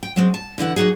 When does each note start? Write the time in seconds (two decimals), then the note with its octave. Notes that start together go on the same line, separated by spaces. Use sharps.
0.03 G5
0.16 F#3 G#3 C4
0.34 A5
0.58 D3 E3 E4 F#5
0.76 F#3 A#3 D#4 F#4 G#4